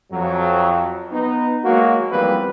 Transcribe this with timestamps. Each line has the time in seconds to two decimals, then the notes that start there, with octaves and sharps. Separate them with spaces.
0.11 F2 F#3
1.12 B3 D#4
1.65 F#3 G#3 A#3 F#4
2.11 E2 F3 G3 A#3 C4 B4